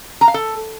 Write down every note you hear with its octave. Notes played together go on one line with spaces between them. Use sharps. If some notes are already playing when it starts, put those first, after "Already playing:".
A#5
F5
A4